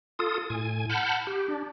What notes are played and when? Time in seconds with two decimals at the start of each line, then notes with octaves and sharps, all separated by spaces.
0.19 F4 A4 D#6
0.50 A2 G#5
0.89 F#5 A5 B5 F6 G6
1.27 G4
1.48 D4